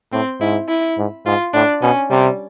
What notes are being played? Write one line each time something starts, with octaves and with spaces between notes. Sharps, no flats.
A2 C4
G#2 E4
E4
G#2
G#2 F4
A2 D4
B2 C#4
C3 G3